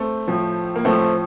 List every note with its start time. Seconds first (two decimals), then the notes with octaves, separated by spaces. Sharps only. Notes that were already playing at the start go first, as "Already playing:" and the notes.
Already playing: A3 C4
0.28 A2 F3
0.76 A#3
0.85 A2 F3 A3 C4